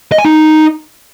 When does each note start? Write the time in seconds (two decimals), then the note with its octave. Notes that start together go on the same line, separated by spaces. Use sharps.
0.12 D#5
0.18 G#5
0.25 D#4